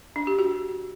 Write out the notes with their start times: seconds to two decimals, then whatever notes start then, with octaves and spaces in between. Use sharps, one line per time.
0.16 D4
0.27 G4
0.39 F#4